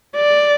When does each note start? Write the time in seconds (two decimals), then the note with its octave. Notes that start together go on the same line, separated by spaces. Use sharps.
0.17 D5